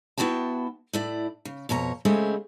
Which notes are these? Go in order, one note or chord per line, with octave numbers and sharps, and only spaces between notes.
B3 E4 F#4 G5 A5
A2 E4 D5
C#3
F2 B2 C#5 A#5
C#3 G#3 A3 C4 G4 G#4